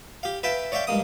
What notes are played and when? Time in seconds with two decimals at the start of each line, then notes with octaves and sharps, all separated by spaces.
0.23 G4 F5
0.43 B4 E5 F5 G5 A5
0.72 C#5 D5 E5 F5 G5
0.87 G2 G#3 A#3 D#6